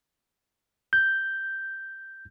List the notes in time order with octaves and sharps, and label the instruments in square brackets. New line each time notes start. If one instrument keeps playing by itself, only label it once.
[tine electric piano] G6